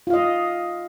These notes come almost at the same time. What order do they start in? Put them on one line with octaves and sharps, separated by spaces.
F4 F5 D#5